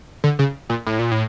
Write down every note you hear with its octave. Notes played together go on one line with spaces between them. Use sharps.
D3
C#3
A#2
A2
A#2
A2